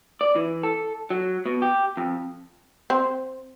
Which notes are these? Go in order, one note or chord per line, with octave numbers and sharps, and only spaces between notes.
D5
E3
A4
F#3
B2
G4
F2
C4